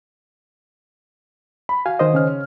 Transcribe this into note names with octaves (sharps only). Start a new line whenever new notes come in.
B5
F#4 F5 G#5
D#3 C5 D#5
C#3 C#4 F6